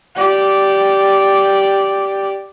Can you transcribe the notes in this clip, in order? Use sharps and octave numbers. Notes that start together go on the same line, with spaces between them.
G4 D5